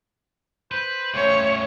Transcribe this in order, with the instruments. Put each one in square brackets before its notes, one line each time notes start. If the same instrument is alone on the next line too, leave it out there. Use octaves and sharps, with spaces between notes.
[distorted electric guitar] B4 [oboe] C5
[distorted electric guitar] A2 C#3 [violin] C#5